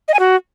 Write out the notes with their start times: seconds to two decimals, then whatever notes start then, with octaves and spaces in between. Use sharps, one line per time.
0.08 D#5
0.14 G#5
0.19 F#4